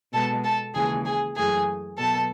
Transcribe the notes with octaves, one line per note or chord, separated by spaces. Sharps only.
B2 G#3 B3 A4 A5
A4 A5
D#2 C#3 E3 G#3 G#4 G#5
G#4 G#5
F#2 E3 A3 G#4 G#5
B2 F#3 B3 A4 A5